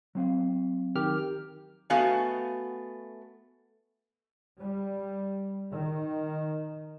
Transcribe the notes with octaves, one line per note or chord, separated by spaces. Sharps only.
F#3 C4 F5
D#3 G4 F6
A3 B3 F#4 D#5 F5 G#5
G3
D#3